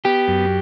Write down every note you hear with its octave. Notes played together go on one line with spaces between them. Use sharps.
B3 G4
F#2